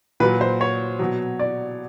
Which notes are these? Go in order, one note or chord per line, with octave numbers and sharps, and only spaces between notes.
A#2 F#3 B4
C5
C#5
B2 F#3
D5